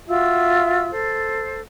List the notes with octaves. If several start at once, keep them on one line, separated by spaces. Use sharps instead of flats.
F4 F#4 E5 E6
A4 C5